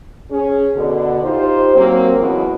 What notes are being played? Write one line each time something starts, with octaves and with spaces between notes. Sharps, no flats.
C#4 G#4
B2 D3
D#4 F4 G4 C5
F#3 A#3 C4
B2 E3 F#3 G#3 C#4 F#4